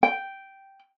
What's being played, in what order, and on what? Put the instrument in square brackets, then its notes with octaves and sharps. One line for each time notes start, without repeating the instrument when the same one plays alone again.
[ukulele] G5